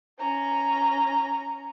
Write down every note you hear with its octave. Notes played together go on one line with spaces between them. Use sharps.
C#4 A#5